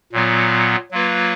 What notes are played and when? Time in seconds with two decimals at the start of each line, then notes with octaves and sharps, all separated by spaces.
0.13 A#2 F#3 B3 F4
0.91 F#3 A#3 F4 B4